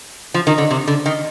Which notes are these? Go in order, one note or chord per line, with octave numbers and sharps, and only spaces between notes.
F3
D#3
D3
C3
D3
D#3